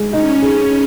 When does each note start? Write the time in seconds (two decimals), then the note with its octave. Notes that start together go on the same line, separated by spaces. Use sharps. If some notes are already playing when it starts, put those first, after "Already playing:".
Already playing: G#3
0.13 C#4 D#4
0.42 G#4